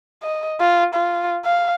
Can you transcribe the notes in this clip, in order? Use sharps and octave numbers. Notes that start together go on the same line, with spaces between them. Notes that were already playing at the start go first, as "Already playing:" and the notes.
D#5
F4
F4
F5